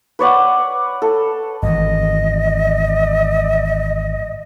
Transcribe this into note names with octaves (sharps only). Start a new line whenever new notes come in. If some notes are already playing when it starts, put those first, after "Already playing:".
B4 C#5 D5 F#5
A4
G#1 E3 D#5